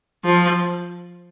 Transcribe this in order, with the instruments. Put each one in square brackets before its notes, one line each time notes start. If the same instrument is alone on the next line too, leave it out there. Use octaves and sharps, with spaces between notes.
[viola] F3